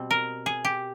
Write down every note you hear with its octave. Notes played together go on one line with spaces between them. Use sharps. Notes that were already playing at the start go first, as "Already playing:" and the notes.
Already playing: B2 G3 C4
A#4
G#4
G4